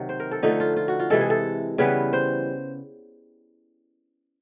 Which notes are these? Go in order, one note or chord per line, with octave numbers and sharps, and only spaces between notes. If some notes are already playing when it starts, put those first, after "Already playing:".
Already playing: C3 D#3 F#3
C5
A#4
A4
D3 F3 A3 D#4
F4
F4
F#4
F4
C3 E3 G#3 A4
G#4
A4
C#3 E3 G3 B3 B4
C5